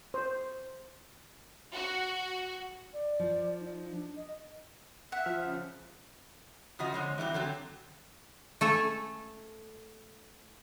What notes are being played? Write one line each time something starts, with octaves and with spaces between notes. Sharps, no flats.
C5
F#4
D5
F3
D#4
D4
D#5
E5 F#5
F3 F6
C#3
C#3 F3 F#4 D#5
D3 G#3 C4 C#5
E3 F#3 G3 B3 C4
D3 F#3 C4
A3 A4 G#5